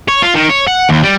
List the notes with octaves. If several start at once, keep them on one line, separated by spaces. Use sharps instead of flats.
C#5
F4
D#3
C#5
F#5
D#2
G3